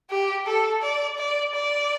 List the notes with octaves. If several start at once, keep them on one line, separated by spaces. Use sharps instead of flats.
G4
A4
D5
D5
D5